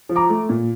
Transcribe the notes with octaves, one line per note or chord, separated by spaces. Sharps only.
F3
A#5 D6
A3
A#2